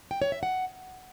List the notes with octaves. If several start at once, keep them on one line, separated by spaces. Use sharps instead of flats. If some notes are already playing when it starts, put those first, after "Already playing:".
G5
C#5
E5
F#5